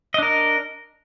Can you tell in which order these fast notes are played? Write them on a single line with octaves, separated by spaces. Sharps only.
D#5 D4 A#4